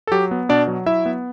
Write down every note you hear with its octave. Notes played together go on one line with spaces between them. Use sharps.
A4
F#3 G4
B3
B2 D4 D5
F#3
F#3 E4 E5
B3